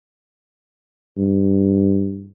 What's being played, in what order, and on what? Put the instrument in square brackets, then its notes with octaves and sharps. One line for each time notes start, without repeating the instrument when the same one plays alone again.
[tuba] G2